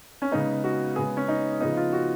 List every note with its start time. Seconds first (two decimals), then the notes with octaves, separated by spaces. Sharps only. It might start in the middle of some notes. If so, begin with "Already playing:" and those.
0.22 C#4
0.32 C#3 G#3 B3 D#4
0.64 F#4
0.96 C#3 G#3 B3 G#4
1.17 C#4
1.28 D#4
1.60 C#3 F3 B3 D#4
1.77 F4
1.93 F#4